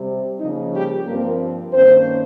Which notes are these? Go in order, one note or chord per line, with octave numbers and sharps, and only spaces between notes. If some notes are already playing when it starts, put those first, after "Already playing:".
Already playing: C3 G3 C4
C#3 F3 A#3 C#4 D#4
G3 G4
G2 F3 A#3 C4 A#4
G2 D#3 A#3 C4 C#4 C5